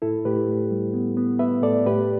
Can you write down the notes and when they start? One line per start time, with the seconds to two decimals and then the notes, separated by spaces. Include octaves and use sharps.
0.02 A2 E4 A4
0.25 A2 G4 B4
0.48 A2
0.71 G3
0.94 B3
1.17 B3
1.39 B3 B4 E5
1.62 A2 A4 D5
1.86 A2 G4 B4